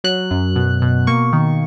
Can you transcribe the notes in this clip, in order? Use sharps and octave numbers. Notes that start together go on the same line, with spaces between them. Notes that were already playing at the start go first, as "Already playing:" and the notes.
F#3 F#6
F#2
B2
B2
A#3 C#6
D#3